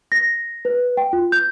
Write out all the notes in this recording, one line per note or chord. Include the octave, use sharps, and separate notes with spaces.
A#6
B4
G5
F4
G6